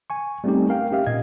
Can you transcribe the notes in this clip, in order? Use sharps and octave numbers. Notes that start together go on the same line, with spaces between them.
G#5 C#6
G3 A3 C4 C#4 D#4 G4
A#4 F5 G5
C#4 G4 E5 F5
A#2 D#5 G#6